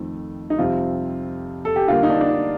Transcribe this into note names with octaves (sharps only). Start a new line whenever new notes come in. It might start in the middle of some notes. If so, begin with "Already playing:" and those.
Already playing: F2 D#3 A3 C4
D#4
F2 C3 G3 C4 F4
A4
G4
D3 G3 A#3 F4
D#4
D4
D4
D#4